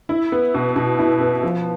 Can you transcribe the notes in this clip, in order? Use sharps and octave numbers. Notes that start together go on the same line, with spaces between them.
E4
B3
B2
B2
E4
B3
F3